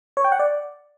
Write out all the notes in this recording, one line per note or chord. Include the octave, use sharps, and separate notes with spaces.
C#5
G5
F#5
D5